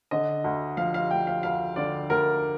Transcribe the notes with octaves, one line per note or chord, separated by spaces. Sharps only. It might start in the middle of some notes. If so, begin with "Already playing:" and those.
D3 D#5
D2
F3 F5
F5
D2 G5
F5
D2 F5
D3 D5
D2 A#4